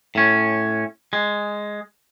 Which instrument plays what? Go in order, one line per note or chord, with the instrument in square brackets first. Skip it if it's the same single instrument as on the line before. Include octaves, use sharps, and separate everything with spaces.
[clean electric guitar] A2 C#4
G#3